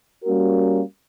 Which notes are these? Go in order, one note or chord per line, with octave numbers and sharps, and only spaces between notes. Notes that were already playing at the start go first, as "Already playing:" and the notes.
G3 A#3 C#4 F#4 A#4